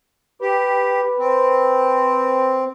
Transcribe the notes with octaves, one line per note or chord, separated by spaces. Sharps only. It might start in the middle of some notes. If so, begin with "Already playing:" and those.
G4 B4
C4